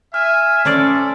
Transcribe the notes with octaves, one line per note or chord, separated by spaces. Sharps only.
E5 G#5 F6
C#4 A4 C5 D5